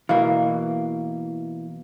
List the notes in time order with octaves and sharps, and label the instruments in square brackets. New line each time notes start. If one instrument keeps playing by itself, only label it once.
[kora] B2 A#3 [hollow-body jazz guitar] E3 [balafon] F5